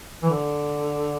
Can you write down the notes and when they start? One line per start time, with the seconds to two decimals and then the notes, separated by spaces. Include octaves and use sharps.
0.23 E3
0.30 D3